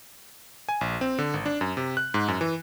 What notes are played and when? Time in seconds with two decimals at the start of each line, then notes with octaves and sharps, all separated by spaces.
0.69 G#5
0.81 A#1
1.01 C4
1.19 D3
1.34 G#1
1.46 D4
1.61 F#2
1.77 C3
1.97 F#6
2.14 G#2
2.28 F#2
2.41 E3